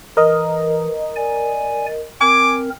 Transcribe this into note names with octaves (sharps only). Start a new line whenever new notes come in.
E3 A#4 D#5
D5 G#5
C4 A#4 G#5 D6